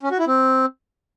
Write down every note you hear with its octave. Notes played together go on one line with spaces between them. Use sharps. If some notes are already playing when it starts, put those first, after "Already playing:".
C#4
F#4
E4
C4